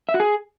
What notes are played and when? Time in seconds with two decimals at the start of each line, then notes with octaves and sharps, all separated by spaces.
0.09 E5
0.14 F#4
0.20 G#4